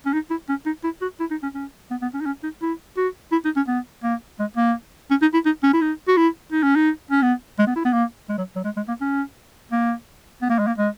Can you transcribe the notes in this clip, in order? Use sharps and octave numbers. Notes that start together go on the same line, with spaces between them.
C#4
D#4
E4
C#4
D#4
E4
F#4
E4
D#4
C#4
C#4
B3
B3
C#4
D#4
C#4
D#4
E4
F#4
E4
D#4
C#4
B3
A#3
G#3
A#3
C#4
D#4
E4
D#4
C#4
E4
D#4
F#4
E4
D#4
C#4
D#4
C#4
B3
G#3
B3
E4
B3
A#3
G#3
F#3
F#3
G#3
G#3
A#3
C#4
A#3
B3
A#3
G#3
A#3
G#3